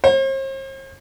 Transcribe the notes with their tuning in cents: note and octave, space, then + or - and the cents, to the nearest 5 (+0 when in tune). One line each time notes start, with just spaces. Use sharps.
C5 +45